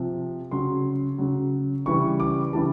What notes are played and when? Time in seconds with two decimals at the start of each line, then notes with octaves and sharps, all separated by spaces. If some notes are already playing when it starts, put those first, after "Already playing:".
Already playing: C3 F3
0.51 C#3 F#3 C6
1.18 C#3 F#3
1.86 C#3 E3 G3 C#6
2.20 D6
2.53 C#3 E3 G3 A5